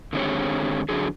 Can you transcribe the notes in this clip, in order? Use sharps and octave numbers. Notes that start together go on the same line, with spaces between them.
D3 D#3 G#3 C4 G4 C#5
D3 F#3 G#4